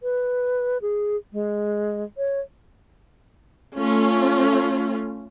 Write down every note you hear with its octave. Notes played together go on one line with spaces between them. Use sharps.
B4
G#4
G#3
C#5
A3 C#4 F4